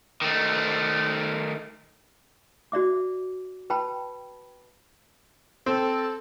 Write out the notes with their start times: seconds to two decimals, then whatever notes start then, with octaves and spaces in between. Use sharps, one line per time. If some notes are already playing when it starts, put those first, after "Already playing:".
0.22 D#3 A3
2.72 F#4 D5 E5 D6
3.70 B4 G5 A5 B5
5.66 C4 A4